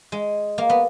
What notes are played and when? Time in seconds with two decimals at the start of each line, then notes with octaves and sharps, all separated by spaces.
0.12 G#3
0.58 A#3
0.70 B3